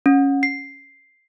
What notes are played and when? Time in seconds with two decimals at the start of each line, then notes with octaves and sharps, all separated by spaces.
0.06 C#4
0.43 C7